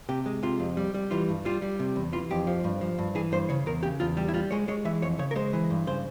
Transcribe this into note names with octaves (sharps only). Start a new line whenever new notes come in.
C3 G4
G#3
C3 F4
F2
G3
G3
E3 F4
G2
G3 F4
G3
C3
E2
E3 F4
F2 G4
F3
G2
F3
G2
E3 G#4
G2 C5
C#3 C#5
E2 A#4
C#3 G4
E2 F4
G3 G4
E4
G3 F4
G#3 C#5
G#3 C#5
E3 E5
F2 C#5
C#3 C#5
A#4
G#3 C5
E3
G2
C#3 C5